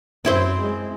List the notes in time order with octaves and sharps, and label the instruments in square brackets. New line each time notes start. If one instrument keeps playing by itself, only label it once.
[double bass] F#2 [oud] C4 E4 C5
[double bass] G#3